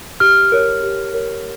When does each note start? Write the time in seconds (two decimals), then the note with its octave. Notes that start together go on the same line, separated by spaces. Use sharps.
0.20 G4 F6
0.52 A#4 C#5
0.83 G4
1.14 A#4 C#5